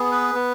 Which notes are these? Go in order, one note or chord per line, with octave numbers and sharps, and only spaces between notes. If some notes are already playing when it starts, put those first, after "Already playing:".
Already playing: B3 G#4
B4
B3